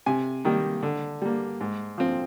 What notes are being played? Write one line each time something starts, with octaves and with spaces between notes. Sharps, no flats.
C3 G#5
D#3 G3 A#3
D3
G3 A#3
G#2
F3 C4